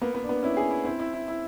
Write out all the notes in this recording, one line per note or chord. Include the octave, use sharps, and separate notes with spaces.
A#3 B3
B3
D4
B3
C#4 E4
G#4
E4
C4 E4
E4
E4
E4